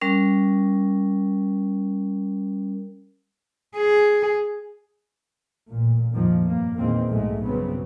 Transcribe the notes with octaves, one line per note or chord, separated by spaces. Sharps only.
G3 C#4 A#4
G#4
A1 A#2
F2 G#2 D#3 F3 A#3
G2 A#3
E2 A#2 D#3 G#3 A#3 C4
B1 G#2 G#3 A3
G2 C#3 F#3 B3 C4